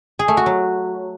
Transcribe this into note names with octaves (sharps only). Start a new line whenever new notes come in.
G#4
A3
F#4
F#3